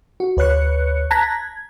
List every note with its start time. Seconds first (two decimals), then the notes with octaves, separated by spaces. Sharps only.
0.20 F#4
0.37 D2 B4 C#5 F#6 C#7
1.11 A5 A#5 F#6 G#6 A#6 B6
1.30 G#6